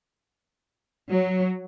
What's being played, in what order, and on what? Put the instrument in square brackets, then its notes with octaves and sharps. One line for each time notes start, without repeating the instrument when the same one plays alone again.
[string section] F#3